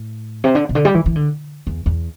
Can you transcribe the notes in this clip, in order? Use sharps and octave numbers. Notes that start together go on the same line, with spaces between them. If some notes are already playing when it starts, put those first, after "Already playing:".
Already playing: A2
C3
D3
C3
D3
G3
E3
E3
D3
E2
E2